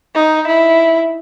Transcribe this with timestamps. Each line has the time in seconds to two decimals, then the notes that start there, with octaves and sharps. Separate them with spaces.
0.15 D#4
0.48 E4